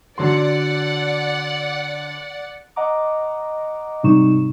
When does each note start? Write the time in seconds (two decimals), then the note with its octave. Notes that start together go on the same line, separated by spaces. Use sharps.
0.18 D3 F#3 D5 F#5 C6
2.76 D#5 F#5 A#5 D6
4.03 G#2 C3 G3 D#4 C#6 E7